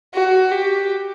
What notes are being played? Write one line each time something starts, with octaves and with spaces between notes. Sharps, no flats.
F#4
G4